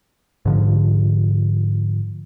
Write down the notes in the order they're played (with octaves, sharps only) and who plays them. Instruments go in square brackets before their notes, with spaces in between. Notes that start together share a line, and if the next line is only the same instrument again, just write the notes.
[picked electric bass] G#2 D3 F3